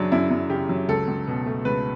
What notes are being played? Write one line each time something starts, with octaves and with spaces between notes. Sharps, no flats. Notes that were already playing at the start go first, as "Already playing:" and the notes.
Already playing: F#2 C#3 F#3 D4
F#2 E4
F#2
C#3 G4
F#3
C#2 A4
C#2
B2
A3
C#2 B4